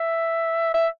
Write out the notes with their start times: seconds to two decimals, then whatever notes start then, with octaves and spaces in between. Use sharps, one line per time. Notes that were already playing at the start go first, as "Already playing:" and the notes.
Already playing: E5
0.74 E5